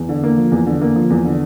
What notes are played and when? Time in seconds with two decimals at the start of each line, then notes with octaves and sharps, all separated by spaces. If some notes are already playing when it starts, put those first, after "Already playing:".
Already playing: E2
0.09 D3
0.23 A#3
0.38 F3
0.52 E2
0.67 D3
0.81 A#3
0.96 F3
1.10 E2
1.25 D3